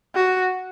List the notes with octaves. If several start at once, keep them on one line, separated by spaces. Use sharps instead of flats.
F#4